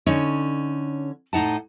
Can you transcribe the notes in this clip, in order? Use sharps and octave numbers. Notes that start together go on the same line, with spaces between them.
D3 C#4 D#4 C#5
A2 D#4 F#5 A5